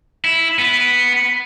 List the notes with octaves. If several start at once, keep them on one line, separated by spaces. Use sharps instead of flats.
E4
B3